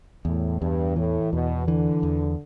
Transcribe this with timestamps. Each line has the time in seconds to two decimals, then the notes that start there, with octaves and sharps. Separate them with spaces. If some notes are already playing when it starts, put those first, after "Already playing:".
0.25 E2 A2
0.61 E2 G2
0.96 A2 E3
1.32 E2 B2
1.67 D3 E3
2.03 E2